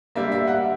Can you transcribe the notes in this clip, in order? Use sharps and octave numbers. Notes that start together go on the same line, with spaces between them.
D3 G3 A#3 E5
E5
F#5